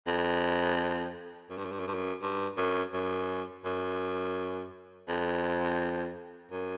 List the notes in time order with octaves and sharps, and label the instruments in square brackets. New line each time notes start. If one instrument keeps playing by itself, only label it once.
[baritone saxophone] F2
F#2
G2
F#2
G2
F#2
G2
F#2
G2
F#2
F#2
F#2
F2
F#2